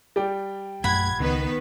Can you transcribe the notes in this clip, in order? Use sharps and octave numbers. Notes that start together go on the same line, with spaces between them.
G3 D5 G5
A#1 F#2 A3 F#5 B5 G#6
C#2 D#3 B3 B4